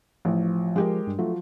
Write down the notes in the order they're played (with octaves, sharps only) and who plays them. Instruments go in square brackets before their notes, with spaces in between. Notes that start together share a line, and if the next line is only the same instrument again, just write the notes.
[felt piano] A1 [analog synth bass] F3
[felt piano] G#3 G4 A#4
[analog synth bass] G2
[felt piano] F3 F#3 [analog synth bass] A3